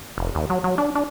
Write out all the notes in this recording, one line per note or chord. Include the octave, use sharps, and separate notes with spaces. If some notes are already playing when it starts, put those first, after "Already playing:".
F1
D#2
F#3
F#3
D4
D4